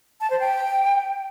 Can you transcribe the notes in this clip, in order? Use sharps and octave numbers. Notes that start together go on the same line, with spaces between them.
A5
C5
G5